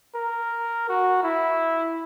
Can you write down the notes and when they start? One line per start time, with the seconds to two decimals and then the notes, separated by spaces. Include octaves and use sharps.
0.15 A#4
0.89 F#4
1.23 E4